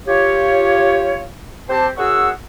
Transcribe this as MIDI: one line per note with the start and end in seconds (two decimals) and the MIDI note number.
0.07 1.22 65
0.07 1.22 67
0.07 1.22 73
1.69 1.88 60
1.69 1.88 67
1.69 1.88 72
1.69 1.88 81
1.98 2.29 42
1.98 2.29 66
1.98 2.29 68
1.98 2.29 78
1.98 2.29 85
1.98 2.29 88